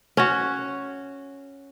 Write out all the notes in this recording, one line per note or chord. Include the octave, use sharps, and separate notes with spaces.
C#4 F#4